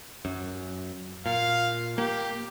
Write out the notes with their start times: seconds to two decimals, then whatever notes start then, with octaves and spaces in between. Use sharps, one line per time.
0.25 F#2
1.26 A#2 F5
1.98 A#3 G4